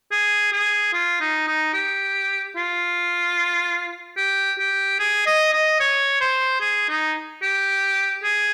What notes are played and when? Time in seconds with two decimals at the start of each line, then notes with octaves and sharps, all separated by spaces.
0.11 G#4
0.53 G#4
0.93 F4
1.21 D#4
1.47 D#4
1.74 G4
2.56 F4
4.17 G4
4.59 G4
4.99 G#4
5.26 D#5
5.53 D#5
5.80 C#5
6.21 C5
6.61 G#4
6.89 D#4
7.42 G4
8.23 G#4